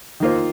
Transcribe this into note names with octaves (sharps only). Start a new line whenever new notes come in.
D#3 A#3 F4 C5